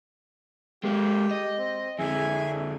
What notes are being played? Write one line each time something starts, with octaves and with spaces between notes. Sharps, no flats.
G#3 A#3 G4
D#5
C4
F2 D3 G#4 E5 G#5